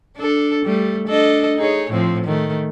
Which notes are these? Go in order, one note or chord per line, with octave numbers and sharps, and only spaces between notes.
D4 A4
G3 A3
D4 A4 D#5
D#4 G#4 C#5
A2 F3 C4
D#3 A3